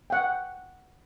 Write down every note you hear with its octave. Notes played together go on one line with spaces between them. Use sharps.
F#5 G5